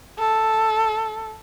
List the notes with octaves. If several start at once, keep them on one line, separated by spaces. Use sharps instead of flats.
A4